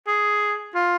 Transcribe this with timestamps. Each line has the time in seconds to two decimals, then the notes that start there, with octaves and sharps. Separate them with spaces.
0.07 G#4
0.75 F4